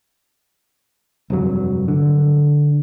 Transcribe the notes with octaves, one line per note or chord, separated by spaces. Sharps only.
F1 G2 F#3
D3